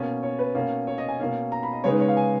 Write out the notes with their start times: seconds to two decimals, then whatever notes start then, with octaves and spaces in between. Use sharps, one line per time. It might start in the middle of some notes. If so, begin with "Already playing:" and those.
Already playing: B2 A#3 C#4
0.23 C#5
0.39 B4
0.55 B2 A#3 C#4
0.87 C#5
0.98 D#5
1.09 G#5
1.19 B2 A#3 C#4
1.52 A#5
1.63 B5
1.73 D#5
1.84 C#3 G#3 B3 D#4 C#5
1.92 B4
2.00 C#5
2.08 F5
2.17 G#5